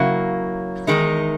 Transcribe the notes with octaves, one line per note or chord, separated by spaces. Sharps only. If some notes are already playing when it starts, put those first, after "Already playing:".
Already playing: C#3 F#3 A#3 E4
E2 D#3 G#3 D#4